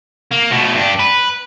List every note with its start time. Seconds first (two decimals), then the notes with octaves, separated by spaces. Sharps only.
0.31 A#3
0.51 B2 A3
0.74 G2 D4
0.99 B4